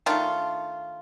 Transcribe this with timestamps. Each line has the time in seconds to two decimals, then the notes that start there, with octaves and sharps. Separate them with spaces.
0.06 D#3 A3 D4 F4